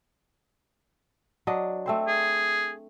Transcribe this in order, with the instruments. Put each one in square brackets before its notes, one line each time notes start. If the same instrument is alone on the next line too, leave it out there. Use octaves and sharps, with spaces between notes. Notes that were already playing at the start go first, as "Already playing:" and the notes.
[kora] F#3 D4 D#5
A3 C4 C5
[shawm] G#4